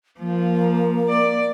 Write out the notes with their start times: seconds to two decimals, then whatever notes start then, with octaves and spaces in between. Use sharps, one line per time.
0.19 F3 A#3
1.09 D5